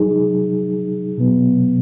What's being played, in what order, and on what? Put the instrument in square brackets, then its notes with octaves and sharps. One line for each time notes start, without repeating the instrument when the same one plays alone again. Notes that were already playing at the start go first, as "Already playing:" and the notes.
Already playing: [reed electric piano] F#3 D#4 G#4
B2 F#3 B3